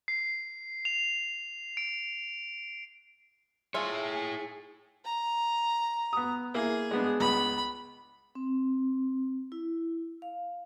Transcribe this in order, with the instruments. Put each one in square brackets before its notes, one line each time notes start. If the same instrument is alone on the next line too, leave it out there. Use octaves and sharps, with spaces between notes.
[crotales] C7
F7
D7
[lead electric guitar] E4 C#5 [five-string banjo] F4 E5 [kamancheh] G#4
[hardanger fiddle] A#5
[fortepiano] B3 D#6
[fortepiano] A#3 E4 [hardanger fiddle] G#4
[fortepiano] G#3 B3 D4
[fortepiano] C#2 B3 [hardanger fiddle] B5
[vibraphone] C4
E4
F5